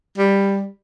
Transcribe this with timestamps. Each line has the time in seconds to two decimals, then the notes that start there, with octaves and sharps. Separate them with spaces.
0.18 G3